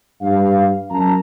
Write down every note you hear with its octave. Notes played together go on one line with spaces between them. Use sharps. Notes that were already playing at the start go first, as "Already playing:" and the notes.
G2 F5
F#2 A5 A#5